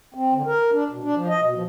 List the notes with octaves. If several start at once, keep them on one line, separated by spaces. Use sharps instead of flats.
C4
D3
A#4
D4
B2
D4
F3
D#5
B2
F3